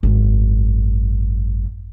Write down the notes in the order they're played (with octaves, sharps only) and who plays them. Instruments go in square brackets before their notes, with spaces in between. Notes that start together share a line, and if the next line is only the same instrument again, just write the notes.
[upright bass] G#1 F#2